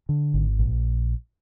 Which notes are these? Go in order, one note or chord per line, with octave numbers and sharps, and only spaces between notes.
D3
G#1
A#1